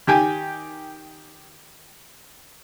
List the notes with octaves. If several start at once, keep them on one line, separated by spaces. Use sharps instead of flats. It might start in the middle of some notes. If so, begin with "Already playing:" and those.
D#3 G4 G5 G#5